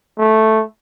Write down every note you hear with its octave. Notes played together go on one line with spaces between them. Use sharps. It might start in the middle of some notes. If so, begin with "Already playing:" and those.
A3